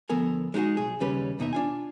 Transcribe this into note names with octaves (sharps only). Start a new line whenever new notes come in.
D2 F3 B3 A4 A#4 G#5
G#3 D#4 E4 F#4 G#4
B1 G#4
D#2 C#3 G3 C#4 B4
D#2 B2 D#4 F#4 E5
D4 F4 G#5